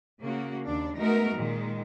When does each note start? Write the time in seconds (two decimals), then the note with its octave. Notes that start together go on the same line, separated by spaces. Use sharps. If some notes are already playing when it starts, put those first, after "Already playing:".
0.20 C#3 A#3 F#4
0.67 D#2 D4
0.98 G#3 A3 B3 D#4 F#4 A#4
1.36 A#2 D#3 G#3